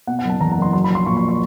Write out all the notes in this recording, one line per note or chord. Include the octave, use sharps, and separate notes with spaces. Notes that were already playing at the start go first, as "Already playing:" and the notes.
B2 F#5
F#5
F#1 A5
E2 A#5
A#5
F#1 C6
F#3 C6
B5
A#1 C6
A#2 C#6
C#6
C#6